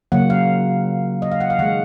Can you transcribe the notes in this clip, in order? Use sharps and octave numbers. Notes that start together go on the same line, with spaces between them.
C#3 F#3 A#3 F#5
F5
D#5
F5
F#5
F5
D#3 G#3 F#5